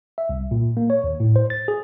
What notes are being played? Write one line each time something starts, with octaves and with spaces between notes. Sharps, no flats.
E5
C2
A#2
A#3
C#5
D#2
A2
C5
A6
G#4